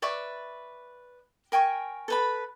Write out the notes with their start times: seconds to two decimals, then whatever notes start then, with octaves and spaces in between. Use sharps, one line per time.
0.02 B4 D5 E5 C#6
1.52 A#4 G5 G#5 C#6
2.08 A4 B4 B5